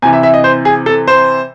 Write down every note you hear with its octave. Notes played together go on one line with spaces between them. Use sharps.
C3 E3 G#5
E5
E5
D#5
C5
G#4
A4
C5